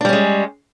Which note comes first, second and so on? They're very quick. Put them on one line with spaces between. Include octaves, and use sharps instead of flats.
D4 G3 C#4 G#3